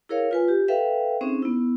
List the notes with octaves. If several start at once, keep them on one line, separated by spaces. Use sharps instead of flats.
E4 G#4 A#4 C#5 F5
F4 B4 G#5
G4
A4 B4 E5 F5 G5
C4 C#4 D#4 G#4 C5
B3 E4